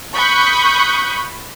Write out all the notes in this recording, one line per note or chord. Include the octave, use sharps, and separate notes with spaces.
B5 C#6 D#6 F#6 G6